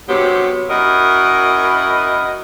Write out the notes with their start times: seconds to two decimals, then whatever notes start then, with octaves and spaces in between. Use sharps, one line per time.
0.08 G2 C3 F#3 B3 G4
0.70 F#2 E4 A#4 D#5 F#5